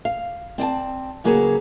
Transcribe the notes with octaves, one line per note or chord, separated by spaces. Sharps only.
F5
C4 D5 G5 A5
C#3 F#3 A#3 F#4 G#4 B4